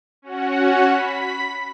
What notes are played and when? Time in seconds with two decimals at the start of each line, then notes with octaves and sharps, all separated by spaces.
0.22 C#4 F#4 F#5
0.84 B5 B6